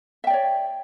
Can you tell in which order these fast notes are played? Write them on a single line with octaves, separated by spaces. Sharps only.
E5 G5 D5 C#5